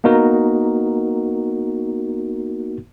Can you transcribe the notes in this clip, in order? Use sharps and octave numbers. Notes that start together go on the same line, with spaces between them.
A#3 B3 D#4 F#4 A#4